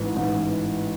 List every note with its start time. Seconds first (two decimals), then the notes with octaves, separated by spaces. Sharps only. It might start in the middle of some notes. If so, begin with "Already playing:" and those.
Already playing: A1 G#2 E3
0.16 A1 G#2 E3